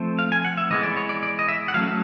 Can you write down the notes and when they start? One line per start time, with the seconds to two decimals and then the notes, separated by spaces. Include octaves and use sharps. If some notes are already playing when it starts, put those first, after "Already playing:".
Already playing: F3 A3 C4
0.19 F5
0.32 G#5
0.45 F#5
0.57 E5
0.71 E3 G#3 B3 D#5
0.83 D5
0.97 C#5
1.09 D5
1.23 D5
1.39 D#5
1.48 E5
1.68 F#5
1.74 F#3 A3 C#4 F5
1.87 E5